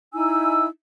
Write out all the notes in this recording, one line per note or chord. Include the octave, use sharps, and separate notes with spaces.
D#4 E4 G#5 E6